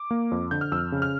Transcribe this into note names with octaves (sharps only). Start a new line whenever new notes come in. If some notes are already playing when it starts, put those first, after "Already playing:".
Already playing: D6
A#3
F2
D3 G6
F6
F2 E6
C#3
F6